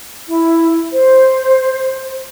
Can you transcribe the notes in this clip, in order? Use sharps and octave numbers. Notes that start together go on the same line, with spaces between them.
E4
C5